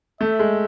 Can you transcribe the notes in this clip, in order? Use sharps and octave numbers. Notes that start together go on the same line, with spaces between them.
A3 E5
G#3